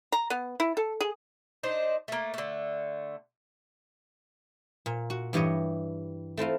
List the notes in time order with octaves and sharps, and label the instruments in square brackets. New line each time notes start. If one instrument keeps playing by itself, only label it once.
[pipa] A#5
B3
E4
A4
G#4
[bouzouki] D4 D#4 C5
A3 A#3
D3 A3
[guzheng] A#2
F#4
G2 E3 G4 C#5 D#5
A3 C4 E4 F4